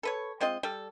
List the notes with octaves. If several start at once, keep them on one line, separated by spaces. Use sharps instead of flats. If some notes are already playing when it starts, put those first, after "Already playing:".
A4 B4 C#5
G#3 C4 F4 D#5
G3 A4